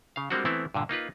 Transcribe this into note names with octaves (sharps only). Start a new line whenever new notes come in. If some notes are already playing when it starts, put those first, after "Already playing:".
C#3 F5
G3 G#3 A#3 C4 D4 F#4
E3 A3 B3 C4 E4
G2 A#2 D3
A#3 D#4 F4 B4